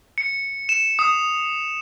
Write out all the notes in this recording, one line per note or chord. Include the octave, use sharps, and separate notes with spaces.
C#7
E7
D#6